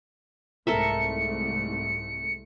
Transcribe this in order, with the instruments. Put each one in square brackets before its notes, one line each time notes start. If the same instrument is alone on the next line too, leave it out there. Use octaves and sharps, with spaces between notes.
[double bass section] C2 G#2 A3 [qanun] A4 A#4 E5 [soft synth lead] C#7